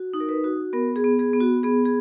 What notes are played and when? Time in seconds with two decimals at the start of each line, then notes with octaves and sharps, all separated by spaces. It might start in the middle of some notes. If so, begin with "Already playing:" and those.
Already playing: F#4
0.14 D#4
0.20 A#4
0.29 B4
0.44 F#4
0.73 B3 A#4
0.96 G#4
1.04 B3
1.19 G#4
1.33 B3
1.40 F#4
1.63 B3 G#4
1.85 G#4